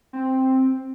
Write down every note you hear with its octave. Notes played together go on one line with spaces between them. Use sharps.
C4